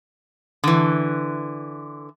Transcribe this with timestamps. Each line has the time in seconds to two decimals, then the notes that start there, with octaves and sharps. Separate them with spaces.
0.64 D3 E3